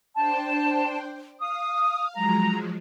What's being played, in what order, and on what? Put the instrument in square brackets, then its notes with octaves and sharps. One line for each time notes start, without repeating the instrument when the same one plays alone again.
[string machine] D4 C5 G5 [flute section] A5
[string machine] F5 [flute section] D#6
[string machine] F3 F#3 G#3 [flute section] A#5